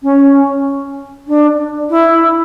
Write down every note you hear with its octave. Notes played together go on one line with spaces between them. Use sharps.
C#4
D4
E4